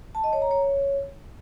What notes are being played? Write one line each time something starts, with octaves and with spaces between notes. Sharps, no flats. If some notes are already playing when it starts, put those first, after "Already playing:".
A5
D#5
C#5
A#5
C#5